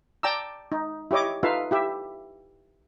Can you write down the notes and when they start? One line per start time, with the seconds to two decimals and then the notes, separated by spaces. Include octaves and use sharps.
0.23 D5 G5 A5 A#5 D6 E6
0.72 D#4
1.11 E4 G4 C#5 D#5 D6
1.43 D#4 F4 A4 B4 E5 F5
1.71 E4 G4 E5